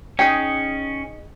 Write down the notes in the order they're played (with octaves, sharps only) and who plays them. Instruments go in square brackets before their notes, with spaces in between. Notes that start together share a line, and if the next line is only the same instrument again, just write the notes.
[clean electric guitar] C#4 [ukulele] D#4 G#4 G5